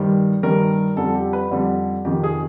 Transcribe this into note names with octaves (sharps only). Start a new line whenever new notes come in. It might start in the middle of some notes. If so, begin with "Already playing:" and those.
Already playing: G2 D#3 G3 C5
G2 D#3 G3 A#4
F2 D3 G3 A4
G4
B4
F2 D3 G3
F2 C3 D#3 G4
G#4